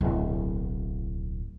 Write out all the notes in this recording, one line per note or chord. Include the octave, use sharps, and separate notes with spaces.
D1 B1